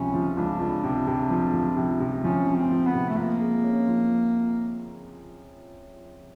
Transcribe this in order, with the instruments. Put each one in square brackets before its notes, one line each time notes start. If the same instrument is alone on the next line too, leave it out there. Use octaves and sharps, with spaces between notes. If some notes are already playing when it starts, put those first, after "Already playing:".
Already playing: [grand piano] C#2 C3 F3 [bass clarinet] C#4
[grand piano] F3
[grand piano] C#2 [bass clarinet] D4
[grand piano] C#2
C3
C3
F3
F3
C3
C3
[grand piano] F3 [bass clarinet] C#4
[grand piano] F3
[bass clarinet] C4
[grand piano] F3
[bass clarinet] B3
[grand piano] C3
[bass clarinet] A3
[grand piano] F3 [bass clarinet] A#3
[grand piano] G#3
C#4
F3